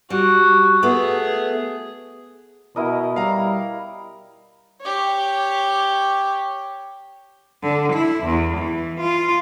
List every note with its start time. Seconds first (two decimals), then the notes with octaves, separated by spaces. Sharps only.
0.10 G3 F#4
0.83 A3 B3 G#4
2.76 B2 E4 A#4 D#5
3.16 G3 F5 A#5
4.81 G4 C#5
7.63 D3
7.93 E4
8.24 E2
8.57 E3
9.00 F4